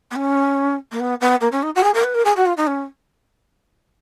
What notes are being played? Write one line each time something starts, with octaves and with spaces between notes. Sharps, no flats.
B3
C#4
A#3
B3
B3
A#3
C#4
D#4
F#4
G#4
A#4
B4
A#4
G#4
F#4
F4
D#4
C#4